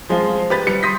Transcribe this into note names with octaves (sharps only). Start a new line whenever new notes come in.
F3 G#3 C4 F4
G4 B4 A6
G3 C#7
C6 D#6 G6 A#6 B6